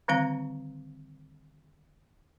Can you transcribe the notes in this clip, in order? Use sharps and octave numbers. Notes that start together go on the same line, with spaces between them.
D3 D#3 G3 C4 F5 A#5